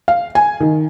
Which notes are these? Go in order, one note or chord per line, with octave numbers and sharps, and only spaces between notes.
F5
G#5
D#3